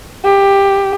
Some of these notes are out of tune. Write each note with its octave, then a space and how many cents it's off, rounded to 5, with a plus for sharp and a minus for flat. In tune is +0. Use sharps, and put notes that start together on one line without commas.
G4 +10